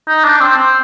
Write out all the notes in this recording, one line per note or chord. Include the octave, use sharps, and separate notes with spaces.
D#4
D4
C4
C4